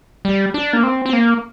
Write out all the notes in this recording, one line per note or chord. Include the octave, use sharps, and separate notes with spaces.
G3
D4
A#3
C4
C4
A#3